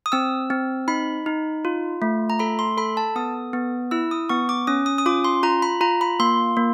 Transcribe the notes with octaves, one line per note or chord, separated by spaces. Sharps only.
D#6
C4 E6
C4
D#4 B5
D#4
F4
A3
A#5
A4 B5
C6
A4 B5
A5
B3 D#6
B3
E4 E6
D#6
B3 C#6
D6
C#4 D#6
D#6
D#6
F4 D6
C6
F4 A#5
B5
F4 A#5
B5
A#3 C6
A#3